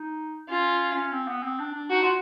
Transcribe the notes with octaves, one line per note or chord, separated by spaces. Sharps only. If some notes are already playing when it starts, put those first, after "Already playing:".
Already playing: D#4
C#4 F4
C#4
C4
B3
C4
D4
D4
D#4 F#4
F4